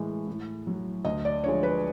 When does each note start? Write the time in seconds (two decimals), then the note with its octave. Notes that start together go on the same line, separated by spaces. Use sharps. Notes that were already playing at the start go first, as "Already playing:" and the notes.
Already playing: A2 E3 G#3
0.27 A2
0.67 F#3
1.05 D2 D#5
1.25 D5
1.44 D3 F3 G#3 C#5
1.63 B4